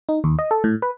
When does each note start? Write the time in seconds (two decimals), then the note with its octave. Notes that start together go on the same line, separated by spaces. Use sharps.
0.09 D#4
0.24 D#2
0.39 D#5
0.51 A4
0.64 A2
0.82 B4